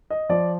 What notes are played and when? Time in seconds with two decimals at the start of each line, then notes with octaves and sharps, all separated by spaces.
0.10 D#5
0.29 F3 D5